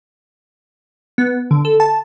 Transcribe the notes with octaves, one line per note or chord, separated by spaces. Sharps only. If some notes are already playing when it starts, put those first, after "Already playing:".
B3
D3
A4
A5